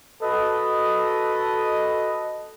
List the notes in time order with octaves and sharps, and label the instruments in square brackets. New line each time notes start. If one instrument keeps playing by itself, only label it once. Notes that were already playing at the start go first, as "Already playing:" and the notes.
[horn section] F#4 A4 B4 D#5